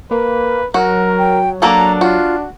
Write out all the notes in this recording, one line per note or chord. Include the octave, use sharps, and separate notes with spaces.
A#3 B4
F#3 F#4 A#4
G5
A#3 D4 F#4 A4 A#5
F4 F#4